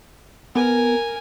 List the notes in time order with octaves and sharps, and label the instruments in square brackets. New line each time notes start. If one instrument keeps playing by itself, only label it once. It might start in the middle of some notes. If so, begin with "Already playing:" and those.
[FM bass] B3 [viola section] A#4 [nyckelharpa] G#5